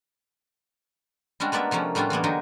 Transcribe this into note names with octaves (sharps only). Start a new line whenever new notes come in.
G3 G#3 C#4 D4 F#4
G#3 A#3 B3 D5 E5
C3 F3 A3 A#3 C#4
A2 G3 B3 C#4 D4 F4
E3 G#3 A#3 B3
D3 F#3 D#4 G5 G#5